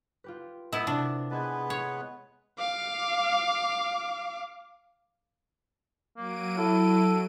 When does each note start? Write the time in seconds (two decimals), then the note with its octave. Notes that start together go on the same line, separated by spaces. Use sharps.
0.24 F4 G4 B4
0.73 B3 E4
0.87 C3 D4 A#4
1.31 G#3 B3 B4 A5 B5 G#6
1.43 G#5
1.70 C#5
2.59 F5 D6
6.17 F#3 A#3 D7 D#7
6.58 E4 A4